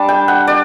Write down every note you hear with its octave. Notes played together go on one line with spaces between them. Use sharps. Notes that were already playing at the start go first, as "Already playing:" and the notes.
Already playing: G3 D4 A5
G5
F#5
D5